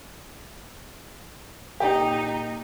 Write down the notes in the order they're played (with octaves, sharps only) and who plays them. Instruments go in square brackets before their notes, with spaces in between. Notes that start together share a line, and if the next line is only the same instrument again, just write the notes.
[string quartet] A#2 D#4 [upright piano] G4